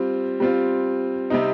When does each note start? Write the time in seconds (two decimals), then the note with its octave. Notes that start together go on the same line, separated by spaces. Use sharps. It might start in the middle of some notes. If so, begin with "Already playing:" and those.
Already playing: G3 C4 F4
0.40 G3 C4 F4
1.30 C3 G3 C4 D#4